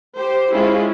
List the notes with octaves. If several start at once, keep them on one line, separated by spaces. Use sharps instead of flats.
G4 C5
G#3 C#4 E4 F4